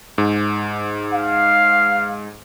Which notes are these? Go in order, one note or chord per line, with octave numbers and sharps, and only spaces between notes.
G#2
F5